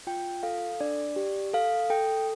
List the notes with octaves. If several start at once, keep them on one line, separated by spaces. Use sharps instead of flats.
F4 G5
A4 F5
D4 D5
G4
A4 F5
A4 G5